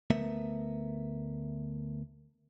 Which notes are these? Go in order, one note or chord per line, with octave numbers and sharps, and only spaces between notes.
D2 A3 B3 A#4 E5